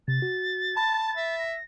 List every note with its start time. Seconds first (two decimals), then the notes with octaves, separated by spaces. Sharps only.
0.08 C3 A6
0.22 F#4
0.77 A5 B5
1.17 E5
1.39 A#6